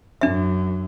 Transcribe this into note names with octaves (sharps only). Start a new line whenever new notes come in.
F#2 D4 E5